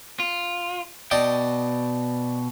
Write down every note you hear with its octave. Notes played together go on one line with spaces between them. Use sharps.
F4
B2 D5 D#5 G5 A5